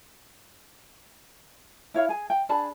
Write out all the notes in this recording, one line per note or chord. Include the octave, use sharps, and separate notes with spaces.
E4 C#5 F5
G#4 G#5
G5
D4 G#4 A5 B5